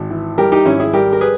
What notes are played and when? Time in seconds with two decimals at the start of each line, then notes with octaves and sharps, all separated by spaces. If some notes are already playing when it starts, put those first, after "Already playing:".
Already playing: G#1
0.10 E3
0.38 G3 G4 A#4
0.52 D#4 G4
0.65 G#1 C#4 E4
0.80 E4 G#4
0.93 G3 G4 A#4
1.13 A#4
1.21 G#4 B4